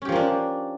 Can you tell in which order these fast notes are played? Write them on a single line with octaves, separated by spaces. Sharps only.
C#4 G4 F3 A#3 D4